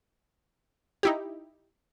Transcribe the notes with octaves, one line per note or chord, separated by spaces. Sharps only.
D#4 E4 G4